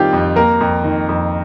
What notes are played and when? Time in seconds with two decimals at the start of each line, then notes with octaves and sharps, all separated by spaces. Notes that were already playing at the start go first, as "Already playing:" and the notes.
Already playing: D#3 G3 C4 F4 G4
0.13 F2
0.36 A#3 A#4
0.61 F2
0.84 D#3
1.09 F2